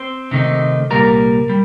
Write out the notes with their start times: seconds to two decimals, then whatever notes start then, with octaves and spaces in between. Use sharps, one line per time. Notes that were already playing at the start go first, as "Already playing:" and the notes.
Already playing: C4 C5
0.31 C3 D#3 A3 D#4
0.90 C2 A#2 G3 A#4 A#5
1.49 G3